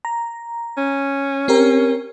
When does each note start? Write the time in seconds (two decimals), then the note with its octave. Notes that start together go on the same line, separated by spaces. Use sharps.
0.05 A#5
0.78 C#4
1.48 C4 G4 A#4